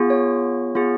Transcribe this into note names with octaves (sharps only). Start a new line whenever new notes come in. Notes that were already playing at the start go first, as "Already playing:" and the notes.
Already playing: B3 F4 G#4
C#5
B3 F4 G#4